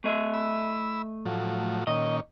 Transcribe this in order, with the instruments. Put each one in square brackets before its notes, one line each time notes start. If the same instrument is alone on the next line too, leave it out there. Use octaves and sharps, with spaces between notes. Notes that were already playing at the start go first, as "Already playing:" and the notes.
[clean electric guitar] A3 D#5 E5
[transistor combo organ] B5 E6
A2 F3 F#3
[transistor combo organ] A#2 D#3 C#4 [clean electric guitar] D#5